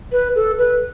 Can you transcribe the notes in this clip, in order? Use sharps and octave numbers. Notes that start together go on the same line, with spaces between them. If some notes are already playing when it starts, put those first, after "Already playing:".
B4
A4
B4